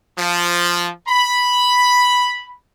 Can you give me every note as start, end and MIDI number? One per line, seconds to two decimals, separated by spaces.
0.19 0.91 53
1.08 2.55 83